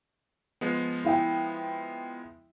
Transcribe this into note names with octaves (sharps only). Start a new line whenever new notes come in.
F3 G#3 B3
E4 E5 G5